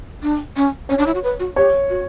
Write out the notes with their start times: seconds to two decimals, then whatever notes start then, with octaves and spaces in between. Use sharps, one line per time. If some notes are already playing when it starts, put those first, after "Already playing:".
0.23 D4
0.56 C#4
0.89 C#4 C#5
0.98 D4
1.06 E4
1.15 F#4
1.24 B4
1.40 F#4
1.56 G4 C#5
1.90 F#4